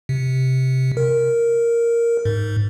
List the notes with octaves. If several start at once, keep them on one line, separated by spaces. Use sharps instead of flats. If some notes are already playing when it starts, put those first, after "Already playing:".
C3
A#4
G#2